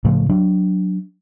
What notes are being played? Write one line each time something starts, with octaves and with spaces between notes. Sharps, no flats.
A2 C#3 F3 A3
F#3 D4